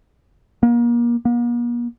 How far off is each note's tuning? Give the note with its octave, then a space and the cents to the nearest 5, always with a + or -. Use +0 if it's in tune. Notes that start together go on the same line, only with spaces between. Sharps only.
A#3 +30
A#3 +45